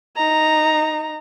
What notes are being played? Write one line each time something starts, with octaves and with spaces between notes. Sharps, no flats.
D#4 A#5